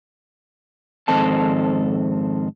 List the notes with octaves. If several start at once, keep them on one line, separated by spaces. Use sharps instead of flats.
F2 G#2 D#3 C4 A4 A5